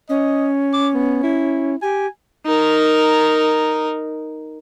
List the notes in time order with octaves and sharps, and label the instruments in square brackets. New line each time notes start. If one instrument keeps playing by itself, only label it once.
[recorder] C#4 [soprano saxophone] D#5
[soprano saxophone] D6
B3
E4
[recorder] G4 [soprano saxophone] G#5
[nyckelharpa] D#4 A#4